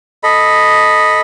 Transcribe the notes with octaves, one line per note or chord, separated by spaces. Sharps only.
A4 D#5 B5